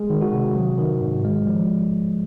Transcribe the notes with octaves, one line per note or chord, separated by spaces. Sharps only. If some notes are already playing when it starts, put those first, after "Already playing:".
Already playing: G#3 G#4
D#3
F#4
C3
F#3
D#3
G#2
G#3
F3